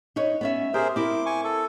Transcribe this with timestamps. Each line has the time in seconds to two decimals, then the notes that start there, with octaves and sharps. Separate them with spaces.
0.16 D#4 B4 C#5
0.41 B3 C#4 E5
0.74 G4 G#4 A#4 C5 E5
0.96 C4 E4 A#4 D6
1.26 G#5 C#6
1.44 A4